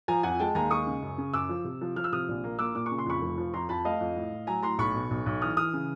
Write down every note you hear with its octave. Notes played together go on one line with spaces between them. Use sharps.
F3 G#5 A#5
F2 F#5 G#5
G#3 G5 A5
D#2 G#5 A#5
G#3 C#6 D#6
C#3
F#2
C#3
F#2 D6 E6
F3
C3
F3
F3 F6
E6
C3 D#6 F6
A#1
A#3
A#3 D6 E6
A#2 D6
C#6
C#3
C6
F2 B5 C#6
F1
F3
F2 A#5 C6
F2 A5 B5
A3 D#5 F5
F2
A2
A2
F#3 G#5 A#5
A2 A#5 C6
B1 B5 C#6
B2
B1
B1
E3 D#6 F6
E3 D#6 F6
C#3